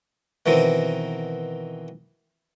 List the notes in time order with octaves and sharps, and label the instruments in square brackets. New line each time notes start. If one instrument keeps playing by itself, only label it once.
[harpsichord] B2 D#3 E3 C4